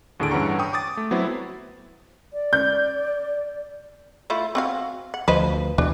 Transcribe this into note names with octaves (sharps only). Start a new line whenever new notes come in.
D#2 A2 D3 A3 G#4 D7
G2 E3 C#4 F#5 A#5 C#6
G5 C#6 D#6
D6 D#6 A6
A3
F#3 B3 C4 E4
D5
G6
A3 E4 F4
C4 F#4 F5
F#5
D2 F3 B4 C5 D#5
D2 B2 E3 D4